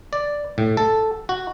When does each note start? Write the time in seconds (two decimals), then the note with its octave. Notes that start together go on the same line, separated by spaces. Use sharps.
0.13 D5
0.58 A2
0.77 A4
1.29 F#4